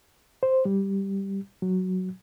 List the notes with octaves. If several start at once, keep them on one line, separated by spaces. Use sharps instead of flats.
C5
G3
F#3